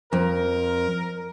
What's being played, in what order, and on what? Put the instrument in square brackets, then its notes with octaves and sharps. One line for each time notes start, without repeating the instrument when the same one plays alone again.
[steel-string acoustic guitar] F2 [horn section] A#4